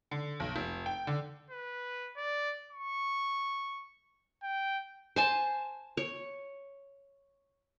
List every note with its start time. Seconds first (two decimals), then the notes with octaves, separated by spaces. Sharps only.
0.11 D3
0.40 B1
0.56 F1
0.86 G5
1.07 D3
1.51 B4
2.17 D5
2.72 C#6
4.43 G5
5.16 C5 G#5 A5
5.97 C#5